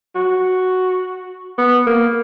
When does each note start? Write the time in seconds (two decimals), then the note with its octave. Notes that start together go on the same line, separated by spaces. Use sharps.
0.16 F#4
1.58 B3
1.87 A#3